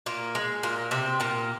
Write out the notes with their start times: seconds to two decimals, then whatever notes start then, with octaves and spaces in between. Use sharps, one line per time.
0.06 A#2 A#3
0.35 G#3
0.63 A#2 A#3
0.91 C3 C4
1.20 A#2 A#3